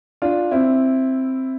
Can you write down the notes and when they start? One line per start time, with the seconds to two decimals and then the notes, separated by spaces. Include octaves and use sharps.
0.22 D4 F4
0.51 C4 E4